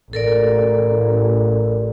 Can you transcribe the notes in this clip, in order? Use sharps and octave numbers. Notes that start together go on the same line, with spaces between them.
A1 A4 A#4 D5